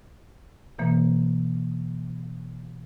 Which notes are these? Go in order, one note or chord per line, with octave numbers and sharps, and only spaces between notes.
B2 E3 A#3